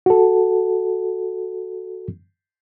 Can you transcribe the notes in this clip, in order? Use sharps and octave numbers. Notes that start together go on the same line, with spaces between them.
F#4 A4